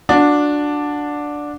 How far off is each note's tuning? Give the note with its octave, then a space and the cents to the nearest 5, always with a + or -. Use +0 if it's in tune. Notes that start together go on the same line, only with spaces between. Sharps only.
D4 +0 F#4 -25 D5 +0